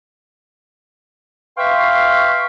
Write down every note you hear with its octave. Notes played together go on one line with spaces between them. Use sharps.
B4 E5 F5 G5 C6 C#6